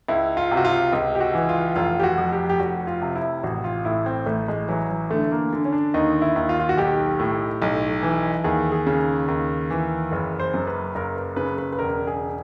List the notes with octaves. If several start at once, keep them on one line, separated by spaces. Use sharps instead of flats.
C#2 E4
F4
C3
F#4
F4
C#2
G4
F#4
E3
F4
F1 F4
G4
F#4
F2
G4
G4
F1 F#4
F4
C3
E4
A1 F#4
F4
A2 E4
C4
A1 A3
G#3
E3 F#3
F#3
D3 A3
A#3
D3
C#4
D4
D#2 D#4
E4
D#2
F4
F4
F#4
B1 G4
A2
B1
E3
D#2 G#4
G#4
C#3
D#2
E3
F#1 B4
C5
F#2
B4
F#1 A#4
B4
C#3 B4
B4
B4
E1 A#4
G#4